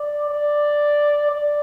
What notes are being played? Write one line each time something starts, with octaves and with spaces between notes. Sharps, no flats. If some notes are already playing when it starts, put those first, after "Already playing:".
Already playing: D5
D5
D5